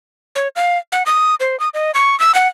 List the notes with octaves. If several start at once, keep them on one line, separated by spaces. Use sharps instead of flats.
C#5
F5
F#5
D#6
C5
D#6
D#5
C#6
E6
F#5